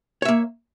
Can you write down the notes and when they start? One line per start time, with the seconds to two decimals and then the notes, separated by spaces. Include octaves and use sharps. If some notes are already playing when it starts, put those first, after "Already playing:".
0.22 C#5
0.25 E5
0.28 A#3